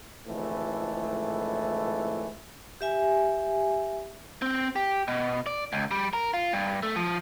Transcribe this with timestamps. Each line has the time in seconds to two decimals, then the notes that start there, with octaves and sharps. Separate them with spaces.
0.26 G#1 C#2 A2 E3 F3 A3
2.81 G4 E5 G#5
4.42 C4
4.76 G4
5.08 B2
5.46 D5
5.73 C#2
5.91 G3
6.13 A#4
6.34 F4
6.53 G2
6.83 A3
6.96 F3